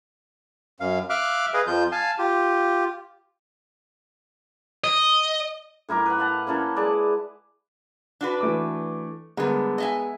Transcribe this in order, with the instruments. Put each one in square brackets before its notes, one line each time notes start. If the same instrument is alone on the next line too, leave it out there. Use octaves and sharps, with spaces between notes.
[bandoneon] F#2 F5
E5 F5 D6 F6 F#6
G#4 B4 D#5 F5
F2 F3 F4 G6
F5 G#5 A5
F4 G4
[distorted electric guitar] D#5
[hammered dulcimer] A2 E4 A#4 D6
B4 F#5
F5 F#5 A5
A#3 C#4 E4 A4
G#3 B4 D5 A5
[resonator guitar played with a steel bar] D4 F#4 B4
[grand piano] E3 A3 D6
[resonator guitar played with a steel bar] D3 G3 [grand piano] G#3 B3 A#4
[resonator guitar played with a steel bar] D#5 E5 G#5